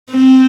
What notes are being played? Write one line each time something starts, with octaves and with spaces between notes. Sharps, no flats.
C4